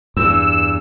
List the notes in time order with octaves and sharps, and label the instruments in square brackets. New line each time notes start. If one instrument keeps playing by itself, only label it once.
[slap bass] E2 G2 [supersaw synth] E6